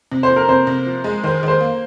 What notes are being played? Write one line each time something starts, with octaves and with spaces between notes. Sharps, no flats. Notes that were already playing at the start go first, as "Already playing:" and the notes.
C3
C5
F3
A#4
C3 C5
C3
F3
G#3
D#3 C5
D#3
C5
A#3